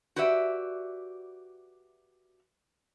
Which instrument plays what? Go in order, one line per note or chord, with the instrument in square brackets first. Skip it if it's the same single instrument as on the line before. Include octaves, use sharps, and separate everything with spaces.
[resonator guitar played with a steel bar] F#4 G4 B4 D5 E5